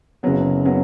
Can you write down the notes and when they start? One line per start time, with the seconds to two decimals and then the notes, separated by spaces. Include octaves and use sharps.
0.23 F#1 F#2 C#3 F#3 B3
0.65 C#3 F#3 B3